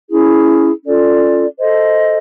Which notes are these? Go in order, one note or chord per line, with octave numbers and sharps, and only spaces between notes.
C#4 E4 G#4
C#4 F4 A4 D5
A4 C5 D#5